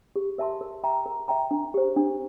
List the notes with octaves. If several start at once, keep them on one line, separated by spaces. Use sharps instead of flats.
G4
A#4 E5 A5 C6
A#4
E5 G5 A#5
A#4
E5 G5 A#5
D4
G4 C5
D4